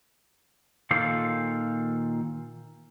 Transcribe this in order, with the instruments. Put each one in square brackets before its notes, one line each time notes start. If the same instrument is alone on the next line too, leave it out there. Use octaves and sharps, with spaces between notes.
[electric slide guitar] A#2 D#3 F4 A4 C5 F5